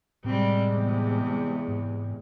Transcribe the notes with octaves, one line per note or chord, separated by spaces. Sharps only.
A2 C3 G3 G#3 C4
E2
G#2